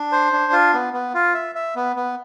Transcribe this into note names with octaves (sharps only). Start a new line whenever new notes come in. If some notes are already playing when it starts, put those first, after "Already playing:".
Already playing: D4
C5
D4
F4
B3
B3
F4
E5
E5
B3
B3